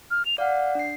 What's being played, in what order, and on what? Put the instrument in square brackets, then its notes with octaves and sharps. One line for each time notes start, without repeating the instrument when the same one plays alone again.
[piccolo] F6
F7
[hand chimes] D5 F#5 [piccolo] F5
[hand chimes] D4 C7